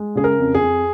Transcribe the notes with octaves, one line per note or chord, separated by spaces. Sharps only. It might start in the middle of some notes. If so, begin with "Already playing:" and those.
Already playing: G#3
C#3 G#4
A#4
F2
G#4
F2